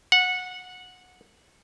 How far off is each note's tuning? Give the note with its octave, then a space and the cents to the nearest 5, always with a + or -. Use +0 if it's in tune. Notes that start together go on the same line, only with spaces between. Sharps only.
F#5 -15